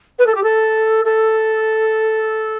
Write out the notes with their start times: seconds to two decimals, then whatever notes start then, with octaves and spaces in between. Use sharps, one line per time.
0.18 B4
0.26 A4
0.34 G4
0.43 A4
1.04 A4